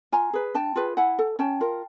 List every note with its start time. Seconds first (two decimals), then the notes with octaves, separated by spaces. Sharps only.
0.12 F4 G#5 A#5
0.33 G#4 B4
0.54 D4 G5 A5
0.76 F4 G#4 B4
0.97 E4 F#5 G#5
1.19 A4
1.39 C#4 G5 A5
1.61 F4 A#4